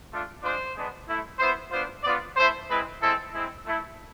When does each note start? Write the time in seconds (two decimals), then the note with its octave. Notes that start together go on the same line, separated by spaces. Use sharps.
0.11 A3 D4 F4
0.42 G#3 D4 F4 C5
0.75 G#3 B3 D4
1.07 A3 E4
1.39 B3 E4 C5
1.71 B3 D4 F4 C5
2.04 B3 D4 F4 D5
2.36 A3 E4 C5
2.69 G#3 C4 E4 B4
3.01 G#3 C4 E4 A4
3.33 G#3 C4 E4
3.66 A3 E4